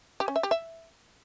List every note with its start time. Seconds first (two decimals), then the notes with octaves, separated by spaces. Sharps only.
0.20 G4
0.28 C#4
0.36 E5
0.43 G4
0.51 E5